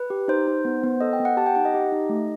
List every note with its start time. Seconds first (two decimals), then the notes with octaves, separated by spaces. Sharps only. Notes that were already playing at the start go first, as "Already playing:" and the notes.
Already playing: B4
0.10 G4
0.28 D#4 C5
0.47 D#4
0.65 B3
0.83 B3
1.01 A4 D#5
1.13 G5
1.20 B3
1.25 F#5
1.37 G4 A5
1.46 G5
1.55 D#4 F#5
1.65 D#5
1.74 G4
1.92 D#4
2.09 A3